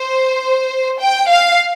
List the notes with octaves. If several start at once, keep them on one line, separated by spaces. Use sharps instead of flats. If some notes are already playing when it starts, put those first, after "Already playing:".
Already playing: C5
G5
F5